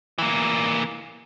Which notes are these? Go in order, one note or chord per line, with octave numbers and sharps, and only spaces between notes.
E3 A#3